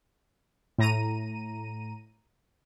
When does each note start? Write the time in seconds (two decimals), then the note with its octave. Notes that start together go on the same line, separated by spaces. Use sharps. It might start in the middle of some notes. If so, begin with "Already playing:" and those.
0.78 A2 A#5 D#7